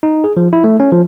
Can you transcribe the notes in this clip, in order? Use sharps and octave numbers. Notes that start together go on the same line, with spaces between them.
D#4
G#4
F3
E4
A3
C#4
F3